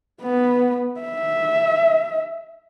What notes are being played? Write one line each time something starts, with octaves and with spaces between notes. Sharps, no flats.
B3
E5